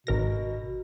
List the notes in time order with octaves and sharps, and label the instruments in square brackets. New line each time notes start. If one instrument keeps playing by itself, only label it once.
[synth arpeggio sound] G#1 A#4 A#6 [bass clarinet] B2